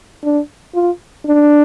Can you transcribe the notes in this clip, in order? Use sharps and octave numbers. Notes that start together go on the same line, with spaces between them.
D4
F4
D4